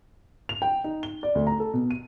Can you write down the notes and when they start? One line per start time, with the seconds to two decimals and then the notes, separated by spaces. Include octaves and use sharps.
0.49 F7
0.62 G5
0.84 D#4
1.03 G7
1.23 D5
1.35 D2
1.47 A#5
1.60 A4
1.74 B2
1.91 D#7